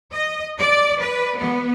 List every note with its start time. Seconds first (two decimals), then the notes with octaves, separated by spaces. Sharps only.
0.12 D#5
0.59 D5
1.00 B4
1.36 B3